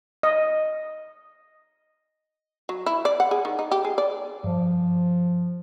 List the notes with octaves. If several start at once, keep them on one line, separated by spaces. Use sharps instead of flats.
D#5
F#3
E4
D5
F#5
G#4
D#3
D#4
G4
G#4
D5
G2 F3